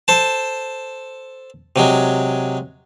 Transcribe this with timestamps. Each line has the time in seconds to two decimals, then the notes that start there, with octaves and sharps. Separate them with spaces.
0.08 A4 C5 A5
1.76 C3 F#3 G#3